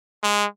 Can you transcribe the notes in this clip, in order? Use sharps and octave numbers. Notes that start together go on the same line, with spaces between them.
G#3